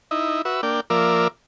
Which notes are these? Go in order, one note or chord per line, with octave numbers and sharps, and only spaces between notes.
D#4 E4
F#4 B4 E5
A#3 D4 G5
F3 A#3 A#4 D5 E5